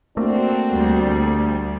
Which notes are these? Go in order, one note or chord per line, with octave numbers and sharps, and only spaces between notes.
A3 A#3 C4 D4 F#4
D2 G3